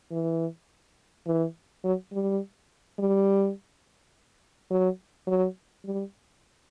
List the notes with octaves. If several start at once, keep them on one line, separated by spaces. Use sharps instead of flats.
E3
E3
F#3
G3
G3
F#3
F#3
G3